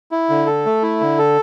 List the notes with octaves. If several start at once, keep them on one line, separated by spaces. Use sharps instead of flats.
E4
D3
A4
A3
E4
D3
A4